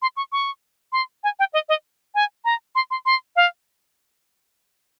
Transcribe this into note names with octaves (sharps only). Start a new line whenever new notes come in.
C6
C#6
C#6
C6
G#5
G5
D#5
D#5
G#5
A#5
C6
C6
C6
F5